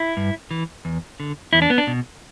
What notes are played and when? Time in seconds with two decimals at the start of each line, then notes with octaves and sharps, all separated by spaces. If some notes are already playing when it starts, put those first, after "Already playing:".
Already playing: E4
0.17 G2
0.51 E3
0.85 E2
1.20 D3
1.53 E2 E4
1.62 D4
1.70 B3
1.78 D4
1.87 B2